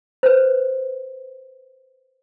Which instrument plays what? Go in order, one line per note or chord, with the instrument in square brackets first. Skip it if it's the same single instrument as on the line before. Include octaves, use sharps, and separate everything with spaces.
[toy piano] B4 C5